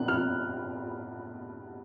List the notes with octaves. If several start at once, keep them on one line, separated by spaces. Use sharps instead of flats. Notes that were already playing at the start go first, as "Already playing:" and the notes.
Already playing: F#6
F6